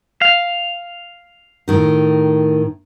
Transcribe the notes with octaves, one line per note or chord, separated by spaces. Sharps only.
F5
A2 D#3 D#4